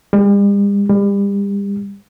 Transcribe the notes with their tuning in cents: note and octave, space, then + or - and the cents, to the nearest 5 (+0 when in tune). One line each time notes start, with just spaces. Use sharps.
G3 +45
G3 +35